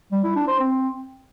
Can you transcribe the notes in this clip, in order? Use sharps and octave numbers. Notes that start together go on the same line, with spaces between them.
G3
E4
D4
C5
C4